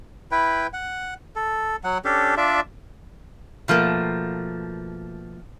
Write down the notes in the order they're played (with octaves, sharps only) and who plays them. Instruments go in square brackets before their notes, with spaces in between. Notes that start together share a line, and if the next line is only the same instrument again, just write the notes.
[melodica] E4 B4 G5
F#5
A4
F#3 F#5
C#4 D4 G4 A4
D4 F4 D5 E5
[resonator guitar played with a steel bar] B2 F3 A3 A#3